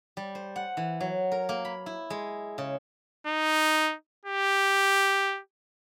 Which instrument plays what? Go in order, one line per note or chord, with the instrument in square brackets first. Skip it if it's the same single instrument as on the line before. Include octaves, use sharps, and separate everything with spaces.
[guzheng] G3
C5
F#5
E3
F#3
A#4
A#3
B5
E4
G#3
C#3
[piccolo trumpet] D#4
G4